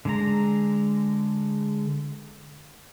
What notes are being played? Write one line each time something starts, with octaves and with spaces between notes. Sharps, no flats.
D3 G#3 A#5